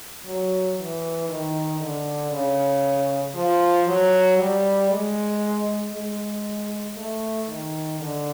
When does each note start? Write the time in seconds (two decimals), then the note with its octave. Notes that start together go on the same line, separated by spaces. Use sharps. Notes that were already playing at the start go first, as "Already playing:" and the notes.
0.26 F#3
0.78 E3
1.29 D#3
1.80 D3
2.32 C#3
3.35 F3
3.87 F#3
4.38 G3
4.90 G#3
5.92 G#3
6.96 A3
7.48 D#3
8.00 D3